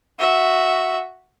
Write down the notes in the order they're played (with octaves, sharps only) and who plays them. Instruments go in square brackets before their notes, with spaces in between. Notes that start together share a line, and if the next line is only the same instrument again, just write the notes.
[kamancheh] F#4 E5